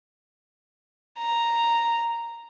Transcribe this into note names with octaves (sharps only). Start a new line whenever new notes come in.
A#5